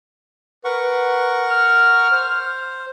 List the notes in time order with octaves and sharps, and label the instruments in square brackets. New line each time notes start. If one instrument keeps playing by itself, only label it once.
[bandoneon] A#4 F#5 C#6 [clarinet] B4
[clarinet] F6
[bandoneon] C5